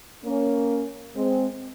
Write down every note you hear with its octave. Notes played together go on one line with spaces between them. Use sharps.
A#3 C#4
G#3 C4